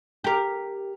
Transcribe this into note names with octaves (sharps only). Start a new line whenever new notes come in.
G4 A#4